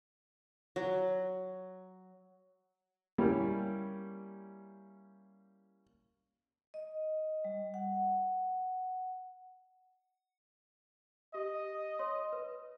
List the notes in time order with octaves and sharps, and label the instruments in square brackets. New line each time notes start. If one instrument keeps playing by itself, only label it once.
[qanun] F#3
[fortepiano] G3 A#3 C#4 E4
[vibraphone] D#5
G3
F#5
[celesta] G4 [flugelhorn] D#5
[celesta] C#5 C6
B4